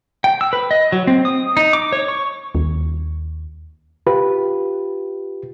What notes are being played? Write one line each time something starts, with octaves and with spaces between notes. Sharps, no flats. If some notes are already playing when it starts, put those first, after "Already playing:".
G5
E6
B4
D#5
F#3
C4
D#6
D#4
D6
C#5
C#6
D#2
F4 G4 B4